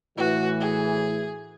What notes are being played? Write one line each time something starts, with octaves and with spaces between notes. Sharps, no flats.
A2 E3 F#4
G#4